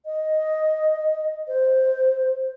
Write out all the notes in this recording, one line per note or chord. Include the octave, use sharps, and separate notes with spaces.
D#5
C5